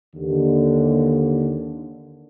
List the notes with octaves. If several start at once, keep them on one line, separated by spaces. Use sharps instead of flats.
D#2 D3